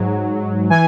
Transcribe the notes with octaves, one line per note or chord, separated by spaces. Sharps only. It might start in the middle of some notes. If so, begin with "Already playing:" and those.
Already playing: G#2 F#3
E3 G#5